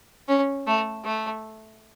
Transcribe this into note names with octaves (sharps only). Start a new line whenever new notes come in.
C#4
A3
A3